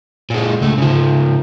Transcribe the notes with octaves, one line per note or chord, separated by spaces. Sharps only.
A#2 G#3
C#2 A3
C#3 F3